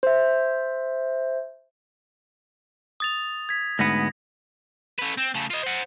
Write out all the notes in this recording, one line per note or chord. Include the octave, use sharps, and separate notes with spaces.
C5 E5
D#6 A6 F7
G#6 B6
D2 G#2 B3 A#6
A3 B4
C4
C#3 A3
F4 D#5
C5 F#5